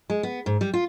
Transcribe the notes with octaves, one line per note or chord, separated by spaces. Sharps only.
G#3
B3
G#2
G3
F4